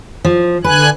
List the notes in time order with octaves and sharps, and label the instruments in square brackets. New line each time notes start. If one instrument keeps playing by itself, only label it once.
[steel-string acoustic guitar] F3
[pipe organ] D3 G#5 F#6 [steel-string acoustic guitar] B4